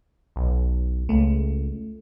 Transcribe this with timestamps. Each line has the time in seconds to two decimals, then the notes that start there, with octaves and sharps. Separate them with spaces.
0.36 B1
1.09 C#2 A3